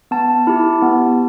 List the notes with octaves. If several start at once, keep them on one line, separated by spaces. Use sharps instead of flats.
B3 A5
E4 G4
B3